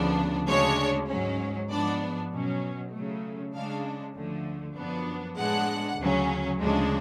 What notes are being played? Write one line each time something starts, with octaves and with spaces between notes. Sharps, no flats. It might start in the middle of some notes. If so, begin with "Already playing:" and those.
Already playing: D2 C#3 F3 B3 D4
D2 C#3 G#3 D4 C#5
G#2 F#3 C#4
G#2 F3 B3 D4 D5
B2 F#3 C#4
C#3 F#3 A3
C#3 G#3 D4 F5
D2 D3 F3 A3
F#2 F3 B3 D4
A2 G#3 B3 D4 F#5
D2 C#3 F#3 C#4
D2 C#3 F3 G#3 D4